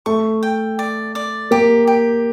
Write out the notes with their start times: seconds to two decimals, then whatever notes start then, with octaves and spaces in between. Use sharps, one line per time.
0.06 A3 C#6
0.43 G5
0.79 D5
1.15 D5
1.51 A#3 G4
1.87 G4